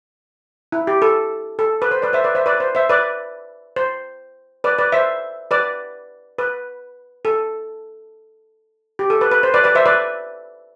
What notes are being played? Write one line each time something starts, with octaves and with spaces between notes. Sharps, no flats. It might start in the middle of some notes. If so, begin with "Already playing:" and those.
E4
G4
A4
A4
B4
C5
B4 D5
C5 E5
B4 D5
C5 E5
B4 D5
C5
C5 E5
B4 D5
C5
B4 D5
B4 D5
C5 E5
B4 D5
B4
A4
G4
A4
B4
B4
C5
B4 D5
B4 D5
C5 E5
B4 D5